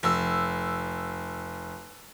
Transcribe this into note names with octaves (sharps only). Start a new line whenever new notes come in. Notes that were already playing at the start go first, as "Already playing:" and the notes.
F1 E6